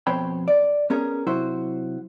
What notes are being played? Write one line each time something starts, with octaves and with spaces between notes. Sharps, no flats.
F2 B2 C5 C#5 G5 B5
D5
B3 C#4 G#4 A#4
C3 F#3 E4 F#4 C5